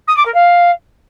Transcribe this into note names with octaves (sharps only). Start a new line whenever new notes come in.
D#6
D6
A#4
F5